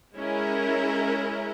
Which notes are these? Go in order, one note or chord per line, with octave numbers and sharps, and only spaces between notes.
G#3 C#4 E4 A#4